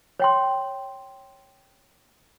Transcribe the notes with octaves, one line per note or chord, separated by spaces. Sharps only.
C#5 G5 C6